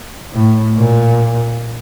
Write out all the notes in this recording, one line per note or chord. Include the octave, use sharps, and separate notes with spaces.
A2
A#2